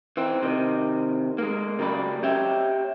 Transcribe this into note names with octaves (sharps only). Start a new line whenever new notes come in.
E3 C4
C3 D#3
G#3 A#3
C#3 F#3 G3 A#3 D5 B5
G4 C#5 E5 G5